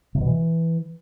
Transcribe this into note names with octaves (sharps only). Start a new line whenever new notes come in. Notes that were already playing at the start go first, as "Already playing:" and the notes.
C3
B2
E3